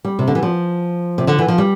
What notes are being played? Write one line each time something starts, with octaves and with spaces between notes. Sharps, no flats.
G3
C3
D3
E3
F3
C3
D3
E3
F3
G3